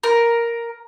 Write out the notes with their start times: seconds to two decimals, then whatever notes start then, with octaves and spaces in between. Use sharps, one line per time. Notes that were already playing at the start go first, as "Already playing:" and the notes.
0.03 A#4